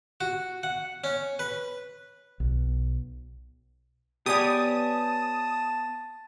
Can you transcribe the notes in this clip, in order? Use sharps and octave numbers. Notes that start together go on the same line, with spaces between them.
F#4
F#5
C#4
B4
B1
B3 G4 C#5 D5 G#5 A5 D#6